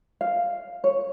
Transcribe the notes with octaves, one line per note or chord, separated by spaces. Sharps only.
F5
C#5